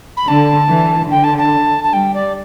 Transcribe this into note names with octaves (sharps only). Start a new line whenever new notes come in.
B5
D3 A5
E3
D3 G5
A5
A5
A5
G3 G5
D5